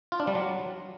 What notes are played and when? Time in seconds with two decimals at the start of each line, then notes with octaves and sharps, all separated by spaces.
0.12 F4
0.20 D4
0.27 G3
0.35 F#3